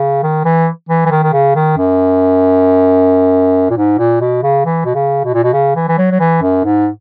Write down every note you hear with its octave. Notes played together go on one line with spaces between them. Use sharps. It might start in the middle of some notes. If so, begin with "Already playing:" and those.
Already playing: C#3
D#3
E3
E3
E3
D#3
D#3
C#3
D#3
F#2
A#2
G#2
A#2
B2
C#3
E3
B2
C#3
B2
A#2
B2
C#3
E3
E3
F#3
F#3
E3
F#2
G#2